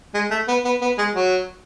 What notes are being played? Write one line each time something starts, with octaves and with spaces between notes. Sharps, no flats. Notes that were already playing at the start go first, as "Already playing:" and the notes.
G#3
A3
B3
B3
B3
G#3
F#3